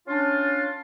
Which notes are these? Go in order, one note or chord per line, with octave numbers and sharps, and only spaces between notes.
C#4 D4 F4